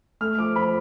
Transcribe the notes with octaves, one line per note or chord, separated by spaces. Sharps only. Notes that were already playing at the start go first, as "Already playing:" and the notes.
A3 F6
F3 D6
F3 B5